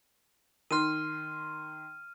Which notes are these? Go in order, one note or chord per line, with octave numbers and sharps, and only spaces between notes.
D#3 C6 F6 D#7